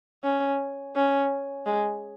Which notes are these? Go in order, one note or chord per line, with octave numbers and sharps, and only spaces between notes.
C#4
C#4
G#3